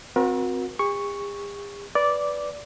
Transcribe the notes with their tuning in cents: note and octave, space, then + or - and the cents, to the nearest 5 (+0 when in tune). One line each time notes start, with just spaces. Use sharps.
C4 +0 F#4 -30 A#4 +40
G#4 -45 C#6 +0
B4 +0 D5 -10 D6 +0